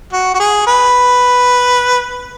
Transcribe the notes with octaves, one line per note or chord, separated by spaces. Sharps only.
F#4
F#4
G#4
B4